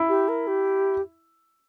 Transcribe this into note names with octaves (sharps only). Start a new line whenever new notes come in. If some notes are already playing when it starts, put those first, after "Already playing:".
Already playing: E4
G4
A#4
G4